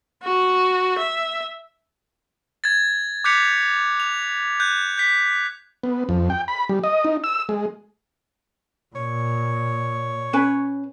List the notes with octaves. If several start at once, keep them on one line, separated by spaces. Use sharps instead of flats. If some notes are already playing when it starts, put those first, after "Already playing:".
F#4
E5
G#6 A6
D6 F#6 G6 B6 C#7 F7
F7
F#6 G6
G6 B6
B3
F2
G5
B5
G3
D#5
D#4
E6
G#3
A#2 C#5
C#4 B4